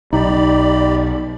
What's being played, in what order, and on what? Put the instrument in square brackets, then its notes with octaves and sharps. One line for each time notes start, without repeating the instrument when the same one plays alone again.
[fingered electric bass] B1 [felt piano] D#4 [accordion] G4 D5 B5